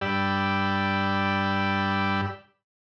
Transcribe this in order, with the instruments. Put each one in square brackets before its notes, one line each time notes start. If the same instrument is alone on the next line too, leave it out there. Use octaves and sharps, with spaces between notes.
[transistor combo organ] G2 G4 D5 B5 E6